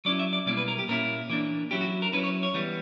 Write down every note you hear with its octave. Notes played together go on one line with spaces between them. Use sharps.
F#3 C#4 E4 D5
E5
D5
B2 G3 A#3 E4 D5
B4
A#4
G4
A#2 A#3 C#4 E4 A#4
E3 A#3 D4
F#3 C#4 E4 G4
F#4
A#4
F#3 C#4 E4 B4
C#5
C#5
E3 G3 B3